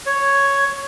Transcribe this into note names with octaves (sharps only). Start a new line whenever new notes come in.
C#5